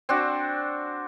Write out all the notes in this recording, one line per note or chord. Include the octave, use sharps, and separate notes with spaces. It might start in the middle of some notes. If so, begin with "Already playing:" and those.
C4 D4 F#4